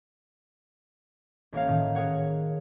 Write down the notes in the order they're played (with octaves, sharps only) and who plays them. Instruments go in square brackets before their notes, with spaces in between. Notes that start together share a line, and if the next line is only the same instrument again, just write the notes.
[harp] A1 A#3 C#5 F5
A2 D#3
G#4 A#4 C#5 F#5